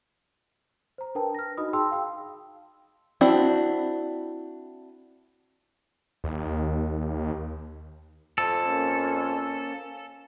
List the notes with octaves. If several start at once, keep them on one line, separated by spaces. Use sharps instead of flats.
C5 A#5
D4 A#4 B4 G5 A5
F6 A#6
D#4 F#4 D#5 B5 D#6
G#4 G5 A5 C6 E6
F5 G5 E6
C4 D4 E4 F#4
D#2
F2 A4
A#3 C#4